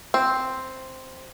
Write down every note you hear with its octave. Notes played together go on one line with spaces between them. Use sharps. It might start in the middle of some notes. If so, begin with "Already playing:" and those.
C4